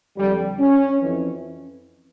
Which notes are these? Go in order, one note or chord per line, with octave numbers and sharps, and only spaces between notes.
F2 D3 G3
C#4
F2 E3